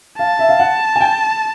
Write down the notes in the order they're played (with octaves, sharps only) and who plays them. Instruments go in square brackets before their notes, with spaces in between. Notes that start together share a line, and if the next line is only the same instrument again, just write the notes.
[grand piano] F5 [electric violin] A5
[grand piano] E5
F5
F#5
G#5
G5